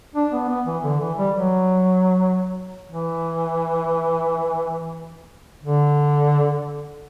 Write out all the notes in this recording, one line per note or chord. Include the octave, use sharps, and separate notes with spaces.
D4
B3
B3
E3
D3
E3
G3
F#3
E3
D3